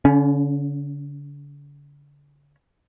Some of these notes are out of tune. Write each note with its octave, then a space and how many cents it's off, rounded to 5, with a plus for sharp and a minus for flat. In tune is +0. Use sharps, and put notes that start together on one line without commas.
D3 -40 C#4 +10